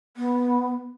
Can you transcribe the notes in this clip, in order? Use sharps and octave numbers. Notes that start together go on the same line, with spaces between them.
B3